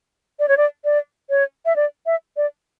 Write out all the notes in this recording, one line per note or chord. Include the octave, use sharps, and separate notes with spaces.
D5
C#5
D5
D5
C#5
E5
D5
E5
D5